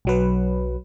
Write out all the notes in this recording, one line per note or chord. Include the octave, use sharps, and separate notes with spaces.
B1 F#3 B4